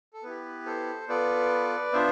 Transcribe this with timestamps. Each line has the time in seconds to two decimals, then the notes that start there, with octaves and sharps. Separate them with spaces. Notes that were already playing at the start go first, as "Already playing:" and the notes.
0.14 A4
0.23 B3 E4 G4 B4
0.66 A4 C5
1.08 B3 F4 A4 B4 D5
1.93 B3 D4 F4 C5 E5